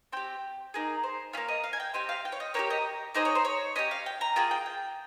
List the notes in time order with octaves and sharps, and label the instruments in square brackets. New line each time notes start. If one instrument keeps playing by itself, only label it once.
[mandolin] C4 G4 G5
A#3 D#4 G#4
C5
A#3 C#4 F4 C#5
D#5
F5
G#5
G5
C4 G4 D#5
F5
G5
C#5
D#5
A#3 D#4 G4 C#5
D#5
A#3 D#4 G#4 C5
C#5
C5
C#5
C#4 G4 D#5
F5
G5
A#5
A#3 F4 G#4 G5
G5
G5